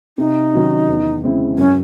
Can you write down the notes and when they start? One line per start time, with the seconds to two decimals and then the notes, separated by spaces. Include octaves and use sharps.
0.18 C3 D#4
0.53 D#3 F#3 C#4
0.88 E2
1.23 C#3 G#3 C4 E4
1.58 F#2 C#4